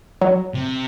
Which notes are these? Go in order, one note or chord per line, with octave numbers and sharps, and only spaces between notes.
F#3
C3